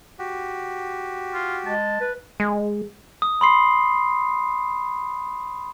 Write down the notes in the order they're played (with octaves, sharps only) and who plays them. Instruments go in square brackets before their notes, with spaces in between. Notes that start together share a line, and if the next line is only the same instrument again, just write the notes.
[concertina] F#4 G4
[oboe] F4
[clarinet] G#3 [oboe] A5
[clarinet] B4
[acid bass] G#3
[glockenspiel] D#6
B5 C6 C7